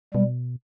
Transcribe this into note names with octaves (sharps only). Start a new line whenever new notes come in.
B2 G3